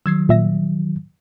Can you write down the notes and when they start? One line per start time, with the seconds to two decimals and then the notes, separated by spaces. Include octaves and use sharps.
0.06 D#3 F#3 E6 G#6 C7
0.29 A#2 E5 A#6